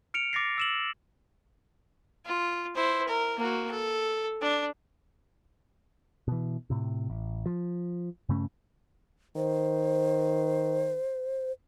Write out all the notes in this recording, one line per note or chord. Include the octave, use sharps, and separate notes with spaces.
F6 C#7 D7 F7
D6 A6 A#6 C7
E6 E7 F#7
F4
E4 C5
A#4
A#3 F#4
A4
D4
B2 E3
A2 C3
A1
F3
G2 C#3 A3 C#4
D#3 C5